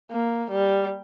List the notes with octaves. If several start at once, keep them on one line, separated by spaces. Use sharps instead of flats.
A#3
G3